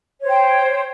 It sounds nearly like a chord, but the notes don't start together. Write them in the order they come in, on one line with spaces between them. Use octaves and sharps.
C#5 C5 G5